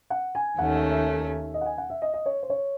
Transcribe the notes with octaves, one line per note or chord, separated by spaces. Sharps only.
F#5
G#5
D#2 D#3 A3 C#4 F#5
E5
E5
D#5
F#5
G#5
F#5
E5
D#5
D#5
C#5
C5
C#5